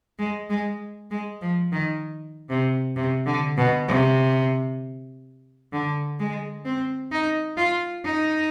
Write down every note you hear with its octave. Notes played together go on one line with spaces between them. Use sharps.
G#3
G#3
G#3
F3
D#3
C3
C3
D3
B2
C3
D3
G#3
C4
D#4
F4
D#4